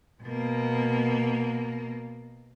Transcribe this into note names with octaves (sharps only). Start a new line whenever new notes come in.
B2 A#3